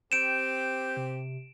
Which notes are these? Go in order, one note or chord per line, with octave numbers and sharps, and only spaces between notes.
C4 G4 G6 D7 E7
C3